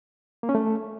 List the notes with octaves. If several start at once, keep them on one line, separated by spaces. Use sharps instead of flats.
A#3
C#4
A3